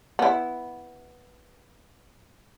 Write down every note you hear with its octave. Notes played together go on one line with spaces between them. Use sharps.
B3 E4